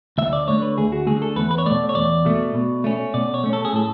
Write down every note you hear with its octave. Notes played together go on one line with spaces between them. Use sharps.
D2 E5
D5
D3 A3 C#5
B4
D2 G#4
F#4
D3 A3 G#4
A4
E2 B4
B4
C#5
B2 A3 D5
C#5
E2 D5
B2 A3
B2
A3 C#4
B2 D5
C#5
A3 C#4
A4
G#4
A2 A4